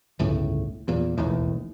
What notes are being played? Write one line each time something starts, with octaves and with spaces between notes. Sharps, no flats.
G1 C#2 A2
E2 A#2
E1 A1 D#2 A2